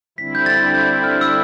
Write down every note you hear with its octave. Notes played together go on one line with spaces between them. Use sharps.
D3 G3 C4 E4 B6
G6
A6
G6
F6
E6